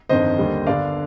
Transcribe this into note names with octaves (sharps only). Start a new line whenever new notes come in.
G1 F2 D#3 C5 D#5
D#2 D3 G3
G1 G2 D3 D5 F5